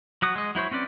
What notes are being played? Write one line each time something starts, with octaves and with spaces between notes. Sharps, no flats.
F#3 F#4 D#6
G#3 D#5
F#3 E4 C5 C#5
C4 C#4 B4 D5